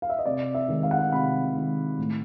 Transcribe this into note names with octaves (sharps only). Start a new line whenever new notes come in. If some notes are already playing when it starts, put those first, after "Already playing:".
F5
E5
D#5
C3 D5
E5
D#3 G#3
F5
F#5
F5
C3 B5
D#3 G#3
A2